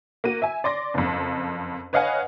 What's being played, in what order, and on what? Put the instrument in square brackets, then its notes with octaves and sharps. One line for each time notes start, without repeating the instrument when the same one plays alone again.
[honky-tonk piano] A#3 F#4 D#7
E5 G#5
D5 C6 D6 A#6
F#1 F2
B4 C#5 D#5 F5 F#5 G#5